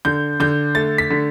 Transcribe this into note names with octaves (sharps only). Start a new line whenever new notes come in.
D3 G6
D3 G6
A3 A6
B6
D3